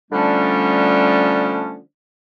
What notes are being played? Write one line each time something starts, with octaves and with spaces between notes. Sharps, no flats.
D3 F3 G3 A3 C#4 D4